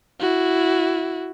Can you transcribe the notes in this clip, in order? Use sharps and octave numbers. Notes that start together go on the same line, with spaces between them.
E4 F#4